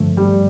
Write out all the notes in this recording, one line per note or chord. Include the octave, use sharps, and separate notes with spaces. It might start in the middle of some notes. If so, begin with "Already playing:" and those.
Already playing: G2 D3 F3 A3
G3